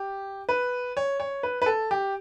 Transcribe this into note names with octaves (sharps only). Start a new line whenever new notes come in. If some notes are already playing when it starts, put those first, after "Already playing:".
Already playing: G4
B4
C#5
C#5
B4
B4
A4
G4